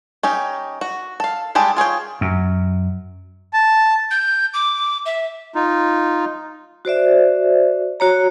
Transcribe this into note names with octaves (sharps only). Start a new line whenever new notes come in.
C#4 D#4 G4
F#4
A4 F5
G3 G#3 G4 A4
F4 G#4 C#5 G5
F#2
A5
G6
D6
E5
D#4 F4
F#4 C5 D5 E5
F#4 C#5 A#5